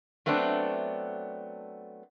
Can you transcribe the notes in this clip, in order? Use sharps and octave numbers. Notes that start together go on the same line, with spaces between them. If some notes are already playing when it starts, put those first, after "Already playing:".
F#3 A3 B3 C4 D4